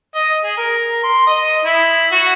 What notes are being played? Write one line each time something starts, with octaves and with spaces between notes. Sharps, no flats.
D#5
G#4
A#4
C6
D#5
E4
F#4